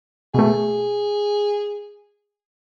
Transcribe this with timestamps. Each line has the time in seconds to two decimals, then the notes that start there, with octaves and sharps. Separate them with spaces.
0.34 B2 A3 G#4